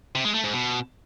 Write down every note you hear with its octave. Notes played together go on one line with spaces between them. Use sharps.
C3
G#3
A3
G#2
B2